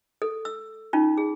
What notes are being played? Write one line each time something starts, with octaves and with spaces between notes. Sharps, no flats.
A4
E6
C#4 D#4 F4
G#4